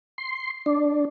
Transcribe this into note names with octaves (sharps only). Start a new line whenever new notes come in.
C6
D4